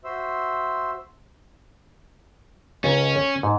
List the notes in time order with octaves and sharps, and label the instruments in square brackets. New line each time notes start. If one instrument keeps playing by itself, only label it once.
[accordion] F#4 C5 E5 C6 E6
[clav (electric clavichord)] C#2 A#4 A#5 [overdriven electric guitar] C#4
[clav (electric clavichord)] C#5
G#2